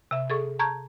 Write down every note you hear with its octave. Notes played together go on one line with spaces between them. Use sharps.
C3 E5
G#4 A4 C#6
A5 A#5 C#6 G6 G#6